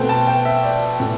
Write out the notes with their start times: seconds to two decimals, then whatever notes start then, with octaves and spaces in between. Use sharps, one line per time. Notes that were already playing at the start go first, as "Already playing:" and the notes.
Already playing: B2 A3 C4 G5
0.09 A5
0.27 G5
0.45 E5
0.64 D5
1.00 A2 E3